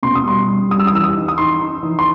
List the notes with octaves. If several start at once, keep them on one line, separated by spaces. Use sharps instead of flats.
B2 C6
D#6
G3 C6
G3
G3 D#6
E6
D#6
E3 E6
D#6
D#4
D#6
D#4 C6
D#4
E3
C6